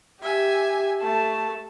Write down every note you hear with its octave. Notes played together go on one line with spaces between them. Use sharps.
G4 E5 G#5
A3 A5